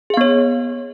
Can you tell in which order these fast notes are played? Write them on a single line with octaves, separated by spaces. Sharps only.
G#4 F5 B3 C#5